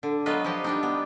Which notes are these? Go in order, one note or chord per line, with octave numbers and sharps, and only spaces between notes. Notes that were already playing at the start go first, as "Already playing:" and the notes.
D3
F#3 G#3 B3 F4 B4 D#5
F3 G4 D#5
G3 D4 D#4
B3